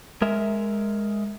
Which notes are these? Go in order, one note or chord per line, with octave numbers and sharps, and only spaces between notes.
G#3 A#4 E5